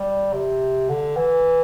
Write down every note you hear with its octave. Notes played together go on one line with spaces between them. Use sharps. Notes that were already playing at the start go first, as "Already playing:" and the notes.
Already playing: G3
C3
D3
E3